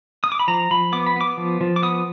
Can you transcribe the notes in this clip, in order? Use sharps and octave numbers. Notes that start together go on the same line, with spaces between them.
D#6
D6
B5
F3 A#5
F3 B5
B3 D6
B5
B3 D6
F3
F3
D6
B3 D#6